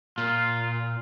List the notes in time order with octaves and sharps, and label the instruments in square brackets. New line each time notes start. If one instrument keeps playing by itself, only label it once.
[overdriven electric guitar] A#2 [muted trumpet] F4